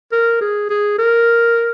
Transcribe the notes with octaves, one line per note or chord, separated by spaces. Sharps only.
A#4
G#4
G#4
A#4